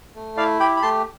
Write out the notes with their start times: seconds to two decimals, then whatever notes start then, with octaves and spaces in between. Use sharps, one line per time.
0.15 A3
0.37 E4 D5 F5
0.60 G4 G5 B5
0.77 B5
0.82 A3 A5 C6